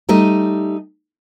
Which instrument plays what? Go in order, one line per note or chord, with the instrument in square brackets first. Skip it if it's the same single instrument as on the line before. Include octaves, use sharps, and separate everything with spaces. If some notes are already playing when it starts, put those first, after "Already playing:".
[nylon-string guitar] G3 A3 D#4 D#5